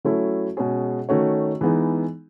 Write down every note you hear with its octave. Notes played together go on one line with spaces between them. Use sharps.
F#3 A3 C#4 E4 A4
B2 G#3 C#4 G#4
D#3 A3 C#4 F#4 C#5
E3 G#3 B3 D#4